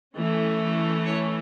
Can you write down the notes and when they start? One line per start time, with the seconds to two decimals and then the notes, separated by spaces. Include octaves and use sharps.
0.16 E3 A3 C#4
1.05 C#5